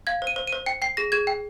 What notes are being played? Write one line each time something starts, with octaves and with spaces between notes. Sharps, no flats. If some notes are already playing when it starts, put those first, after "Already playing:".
F5 G#6
C5
D#7
C5
D#7
C5
G5 C#7
G5 C7
G#4 A#6
G#4 G#6
G5